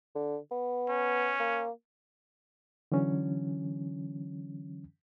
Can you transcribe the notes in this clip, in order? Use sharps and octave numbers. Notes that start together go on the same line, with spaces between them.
D3
B3
C#4
A#3
D3 E3 F#3 C#4